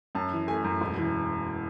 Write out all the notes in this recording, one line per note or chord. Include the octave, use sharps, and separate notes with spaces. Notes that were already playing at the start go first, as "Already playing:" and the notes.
F#2 A5
E3
A3 G#5
F#2
E1
E3